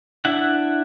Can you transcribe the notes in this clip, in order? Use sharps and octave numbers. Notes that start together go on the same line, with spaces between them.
D4 E4 E5 F#5